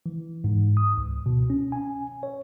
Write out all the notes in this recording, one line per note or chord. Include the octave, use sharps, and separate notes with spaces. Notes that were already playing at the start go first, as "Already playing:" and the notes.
E3
G#2
D#6
C#2
B2
C#4
G#5
C#5